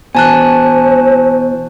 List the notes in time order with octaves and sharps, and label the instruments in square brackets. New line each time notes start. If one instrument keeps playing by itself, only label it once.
[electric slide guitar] B2 E3 [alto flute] C5 [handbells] G#5 A5 F#6